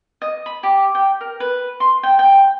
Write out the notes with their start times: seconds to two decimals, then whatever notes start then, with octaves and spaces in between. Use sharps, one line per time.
0.22 D#5
0.46 B5
0.63 G4
0.95 G5
1.21 A#4
1.40 B4
1.80 C6
2.03 G5
2.19 G5